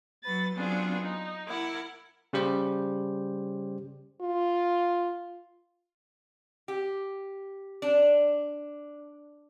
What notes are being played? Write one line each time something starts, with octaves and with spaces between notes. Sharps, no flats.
F#3 B4 A6
F#3 B3 C4 D4 F4 G#4
D#4
E4 A#4 F#5 D6
C#3 G3 G4 C5
F4
G4
D4